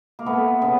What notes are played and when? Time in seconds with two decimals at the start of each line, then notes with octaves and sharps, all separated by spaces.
0.19 A#3
0.26 A3 B3
0.62 C#3 B3